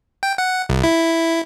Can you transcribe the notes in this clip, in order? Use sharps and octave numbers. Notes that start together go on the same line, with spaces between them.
G5
F#5
C2
E4